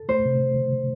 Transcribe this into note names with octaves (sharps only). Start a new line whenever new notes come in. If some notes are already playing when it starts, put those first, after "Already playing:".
Already playing: A4
A3 C5
C3